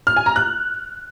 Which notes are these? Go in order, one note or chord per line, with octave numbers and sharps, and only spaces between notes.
F6
G#5
A#5
F#6